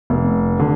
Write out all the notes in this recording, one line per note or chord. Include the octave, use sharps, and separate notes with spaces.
F1
D3